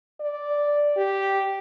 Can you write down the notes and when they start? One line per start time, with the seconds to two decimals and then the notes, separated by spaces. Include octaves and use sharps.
0.21 D5
0.97 G4